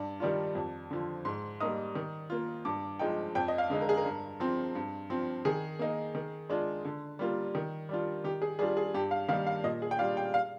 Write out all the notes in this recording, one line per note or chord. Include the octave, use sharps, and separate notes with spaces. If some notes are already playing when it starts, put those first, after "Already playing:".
Already playing: G2 D5
D#3 G3 D4 F4
F2
D3 F3
G#2 C6
G3 A#3 D#4 D#6
D#3
A#3 F4
G2 D6
F3 G#3 D#4 G5
F2 G5
D#5
F5
D3 G#3 D#4
A#4
G#4
A#4
G2
F3 C4
G2
F3 C4
D#3 G#4
A#3 D#4
D#3
G#3 D4 F4
D3
G3 A#3 F4
D#3
G3 D4 F4
D#3 G4
G#4
G3 D4 F4 G#4
G#4
G2 G4
F5
D#3 G3 A#3 D#4 F5
F5
A#2 D#5
G#4
G5
G3 D4 F4 F5
G5
F5